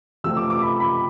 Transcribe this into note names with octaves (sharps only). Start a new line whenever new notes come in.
C3 F3 A3 C4 E6
D6
D6
B5
B5